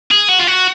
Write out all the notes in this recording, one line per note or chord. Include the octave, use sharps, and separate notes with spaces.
G#4
F#4
F4
F#4